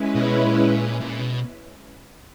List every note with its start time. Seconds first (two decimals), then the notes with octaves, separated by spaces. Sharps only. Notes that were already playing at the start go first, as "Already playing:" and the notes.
Already playing: G#3 C#4 E4 B4
0.15 B2
0.44 A#2
1.01 A#2
1.19 B2